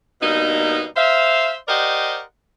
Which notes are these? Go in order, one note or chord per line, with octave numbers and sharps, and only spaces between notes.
G2 B2 A#3 B3 D#4
C5 E5 F5
G4 A#4 C5 D5 D#5 F#5